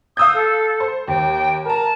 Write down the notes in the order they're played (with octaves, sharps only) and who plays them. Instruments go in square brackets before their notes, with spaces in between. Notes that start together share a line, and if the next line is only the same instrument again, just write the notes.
[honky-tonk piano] F5 E6 G6 [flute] D#6
[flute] A4
[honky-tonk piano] C5
[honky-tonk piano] D#2 [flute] G5
[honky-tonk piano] A#4 A#5 [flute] A5